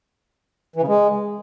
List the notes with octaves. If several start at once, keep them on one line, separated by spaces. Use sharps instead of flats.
E3
C#3
G#3